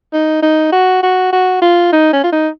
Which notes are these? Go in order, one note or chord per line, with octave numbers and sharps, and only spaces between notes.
D#4
D#4
F#4
F#4
F#4
F4
D#4
C#4
F4
D#4